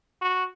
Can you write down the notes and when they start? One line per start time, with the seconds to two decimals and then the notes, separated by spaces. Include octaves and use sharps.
0.22 F#4